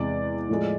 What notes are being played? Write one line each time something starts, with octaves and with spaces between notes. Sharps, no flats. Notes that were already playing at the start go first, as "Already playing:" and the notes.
Already playing: E2 C3 G#3 D5
A2 F3 G#3